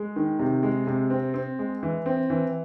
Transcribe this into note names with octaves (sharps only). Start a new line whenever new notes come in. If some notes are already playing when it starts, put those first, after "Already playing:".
Already playing: G#3
D#3
C3
G#3
C3
C4
C4
G#3
E3
C4
E3